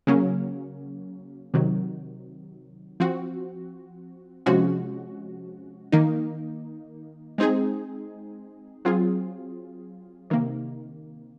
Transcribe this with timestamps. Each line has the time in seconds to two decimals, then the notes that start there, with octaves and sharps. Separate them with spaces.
0.07 C#3 F#3 A#3 C#4
1.54 C3 D#3 F#3
3.00 F3 C4 F#4
4.46 C3 F3 G#3 C#4 F#4
5.92 D#3 A#3 D#4
7.38 G#3 C4 D#4 G#4
8.85 F#3 C4 F4 G#4
10.30 C3 D#3 A#3